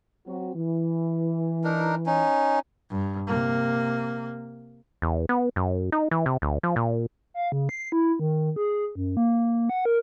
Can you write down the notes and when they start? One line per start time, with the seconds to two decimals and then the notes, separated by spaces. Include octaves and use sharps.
0.26 F#3 C4 F#4
0.55 E3
1.64 D4 D#4 A#4
2.06 C#4 D#4
2.90 G2
3.28 C3 A#3
5.02 E2
5.29 B3
5.56 F#2
5.92 D#4
6.11 E3
6.26 C3
6.42 D2
6.63 F3
6.76 A#2
7.34 F5
7.52 C#3
7.69 C7
7.92 E4
8.19 D#3
8.56 G#4
8.95 F#2
9.17 A#3
9.70 F#5
9.85 A#4